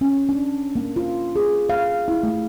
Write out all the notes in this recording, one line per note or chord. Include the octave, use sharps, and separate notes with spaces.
C#4
D4
A#3
F4
G#4
F5
E4
A3